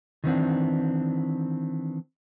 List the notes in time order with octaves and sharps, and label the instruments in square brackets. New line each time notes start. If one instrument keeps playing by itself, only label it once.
[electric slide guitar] D#3 E3 C4 D4